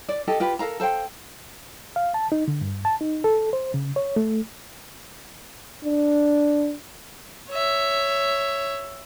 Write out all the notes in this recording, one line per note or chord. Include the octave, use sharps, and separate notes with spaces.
D5
G4 A4 D#5
F4 G4 B4
A4 A#4 F5 A#5
A4 C5 F5 G5
F5
A5
D#4
D3
G2
A5
D#4
A4
C5
C#3
C#5
A3
D4
C#5 E5